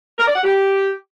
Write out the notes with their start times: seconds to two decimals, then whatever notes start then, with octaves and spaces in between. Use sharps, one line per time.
0.18 A#4
0.27 D5
0.35 F#5
0.43 G4